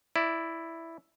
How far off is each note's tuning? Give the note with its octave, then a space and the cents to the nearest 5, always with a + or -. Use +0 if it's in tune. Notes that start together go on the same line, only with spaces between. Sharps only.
E4 +0 D5 +0